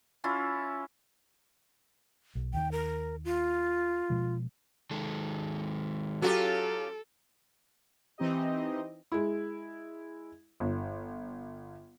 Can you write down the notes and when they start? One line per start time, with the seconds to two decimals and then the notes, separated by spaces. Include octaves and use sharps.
0.24 C#4 E4 F4
2.35 B1
2.53 D#2 D#3 G5
2.72 A#4
3.25 F4
4.10 B2 F3 G#3
4.91 D#3 G#3 A4
6.22 F#3 C#4 F4 G4 A4
8.18 E3 C4 D#4 G4 D#5
9.12 G#3 E4
10.60 G1